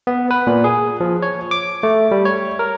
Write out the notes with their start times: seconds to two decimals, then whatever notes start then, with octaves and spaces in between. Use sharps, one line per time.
0.07 B3
0.31 B4
0.47 A#2
0.64 G#4
1.00 F3
1.22 C#5
1.51 D6
1.83 A3
2.11 G3
2.25 C#5
2.59 A#4